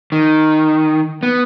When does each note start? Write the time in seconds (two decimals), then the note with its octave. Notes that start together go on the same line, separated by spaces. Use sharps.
0.12 D#3
1.23 B3